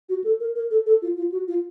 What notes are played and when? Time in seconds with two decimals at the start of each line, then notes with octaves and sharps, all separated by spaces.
0.09 F#4
0.24 A4
0.40 A#4
0.55 A#4
0.71 A4
0.86 A4
1.02 F4
1.17 F4
1.32 F#4
1.48 F4